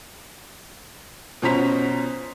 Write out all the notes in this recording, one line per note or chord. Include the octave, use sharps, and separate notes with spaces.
B2 F3 C#4 C5 A#5 B6